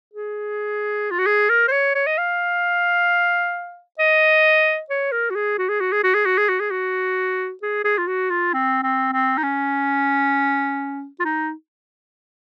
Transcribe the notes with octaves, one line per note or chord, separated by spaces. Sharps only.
G#4
F4
F#4
G#4
A#4
C5
C#5
C#5
D#5
F5
D#5
C#5
A#4
F#4
G#4
F#4
G#4
F#4
G#4
F#4
G#4
F#4
G#4
F#4
G#4
F#4
G#4
G#4
F4
F#4
F4
C4
C4
C4
D#4
C#4
F4
D#4